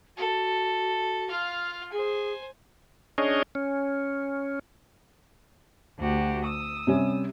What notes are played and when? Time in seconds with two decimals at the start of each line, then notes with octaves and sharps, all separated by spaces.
0.17 F#4 A4
1.28 F4 F5
1.92 G#4 C5 G#5
3.18 C#4 D4 G#4 C#5 D#5
3.55 C#4
5.98 D2 F#4 G4
6.44 D#6 E6
6.87 C3 G3 C#4